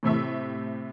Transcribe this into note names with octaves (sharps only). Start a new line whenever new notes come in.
A2 C3 A3 E5